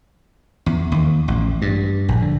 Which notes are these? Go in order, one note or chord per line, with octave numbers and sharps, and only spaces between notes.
E2
D#2
A1
G2
A#1
D3